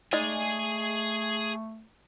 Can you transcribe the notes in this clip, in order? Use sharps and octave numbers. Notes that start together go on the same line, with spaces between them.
G#3 A3 D#4 G#4 D5 G#5